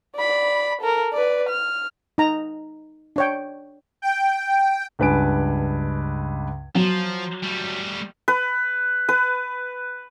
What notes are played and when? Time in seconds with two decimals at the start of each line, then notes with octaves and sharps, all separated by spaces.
0.16 D5 B5
0.81 A4 A#4
1.13 B4 D5
1.49 F6
2.18 D#4 A#5
3.16 D4 C#5 G5
4.02 G5
4.99 C#2 G2 B4 G#5 D7
6.75 F3 F#3
7.43 G3 A3
8.28 B4
9.09 B4